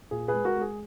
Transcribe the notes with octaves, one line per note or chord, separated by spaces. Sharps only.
A#2 G#4
G#4 B4
G#3
F#4 A#4
G#3
G#4